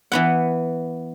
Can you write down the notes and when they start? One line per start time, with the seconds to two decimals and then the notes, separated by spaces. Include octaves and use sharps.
0.12 E3 B3 F#5